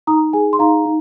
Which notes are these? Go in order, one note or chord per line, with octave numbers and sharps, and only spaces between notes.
D#4 A#5 D#6
G#4 G#5
C6
D#4 F5 A#5
D#4